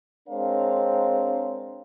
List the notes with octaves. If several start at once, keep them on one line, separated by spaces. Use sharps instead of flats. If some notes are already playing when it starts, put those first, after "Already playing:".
G#3 C4 D4 A#4 C#5 F5